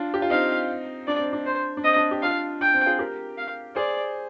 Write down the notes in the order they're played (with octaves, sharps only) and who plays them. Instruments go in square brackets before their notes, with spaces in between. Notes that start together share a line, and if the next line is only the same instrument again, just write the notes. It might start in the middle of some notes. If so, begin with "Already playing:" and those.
Already playing: [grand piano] D4 F4
G4
F4
[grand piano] C4 D#4 [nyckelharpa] F5
[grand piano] D4 [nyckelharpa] D5
[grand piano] C4
D4
[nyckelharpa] C5
[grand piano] D4
[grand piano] C4 [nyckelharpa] D#5
[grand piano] D4
G4
[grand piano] D4 F4 [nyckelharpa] F5
[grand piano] D4 [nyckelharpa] G5
[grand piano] C4
F4 G#4
G4 A#4
[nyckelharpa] F5
[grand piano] G#4 C5 [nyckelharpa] D5